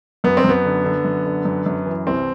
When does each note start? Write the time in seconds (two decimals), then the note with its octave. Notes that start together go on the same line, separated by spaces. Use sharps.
0.24 F#2 B3
0.37 C4
0.44 F#2 B3
0.65 D3
0.84 D3
1.04 F#2
1.25 D3
1.45 F#2
1.66 F#2
1.86 E3
2.07 C2 C4